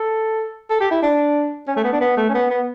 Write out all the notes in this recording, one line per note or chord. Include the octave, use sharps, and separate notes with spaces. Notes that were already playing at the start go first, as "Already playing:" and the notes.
Already playing: A4
A4
G4
E4
D4
C#4
A3
B3
D4
B3
A3
C#4
B3
B3